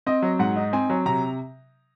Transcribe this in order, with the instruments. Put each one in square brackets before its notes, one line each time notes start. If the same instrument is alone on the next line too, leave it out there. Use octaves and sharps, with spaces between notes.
[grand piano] C4 D#5
F#3
G#2 F#5
D#4
C4 G#5
F#3
C3 A#5